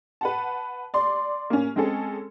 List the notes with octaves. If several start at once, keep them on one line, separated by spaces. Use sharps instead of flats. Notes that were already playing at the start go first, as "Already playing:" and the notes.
B4 F#5 A5
D5 C6
A#3 C#4
G#3 C4 C#4 G#4 A4